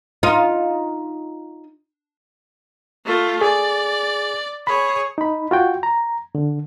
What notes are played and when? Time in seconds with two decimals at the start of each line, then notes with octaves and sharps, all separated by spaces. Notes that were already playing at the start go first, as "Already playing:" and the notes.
0.23 D#4 F4
3.05 A3 F4
3.41 G#4 D5
4.67 G#4 C#5 B5
5.18 D#4 B5
5.51 F4 F#4 G5
5.83 A#5
6.35 D3